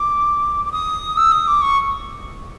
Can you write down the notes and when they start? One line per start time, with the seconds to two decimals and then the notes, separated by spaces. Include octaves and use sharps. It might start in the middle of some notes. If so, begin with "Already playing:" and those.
Already playing: D6
0.65 D6
0.72 D#6
1.17 E6
1.32 D#6
1.47 D6
1.62 C#6